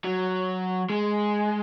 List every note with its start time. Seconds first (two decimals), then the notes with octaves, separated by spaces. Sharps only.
0.04 F#3
0.90 G#3